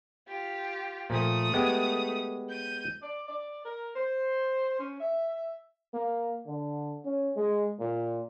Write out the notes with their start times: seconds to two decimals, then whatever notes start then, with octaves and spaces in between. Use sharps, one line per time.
0.28 F4 G4
1.10 A#2 F3 A3 D#6
1.54 G#3 B3 G4
2.49 G6 D#7
3.02 D5
3.28 D5
3.65 A#4
3.95 C5
4.79 C#4
5.00 E5
5.94 A#3
6.46 D3
7.05 C#4
7.36 G#3
7.79 A#2